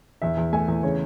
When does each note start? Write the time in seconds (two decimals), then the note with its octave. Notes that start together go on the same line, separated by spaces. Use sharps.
0.22 E2 E5
0.37 E2
0.53 A3 G#5
0.68 E2
0.83 C#3 C#5